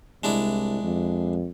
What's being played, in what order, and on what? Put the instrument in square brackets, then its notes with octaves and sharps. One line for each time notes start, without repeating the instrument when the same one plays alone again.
[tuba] C2 [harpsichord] G#3 D4 E4
[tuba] F2